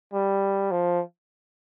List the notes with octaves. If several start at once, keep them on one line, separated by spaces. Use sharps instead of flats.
G3
F3